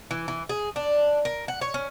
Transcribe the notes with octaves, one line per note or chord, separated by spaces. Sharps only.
E3
E3
G#4
D4
A#4
F#5
C#5
C#4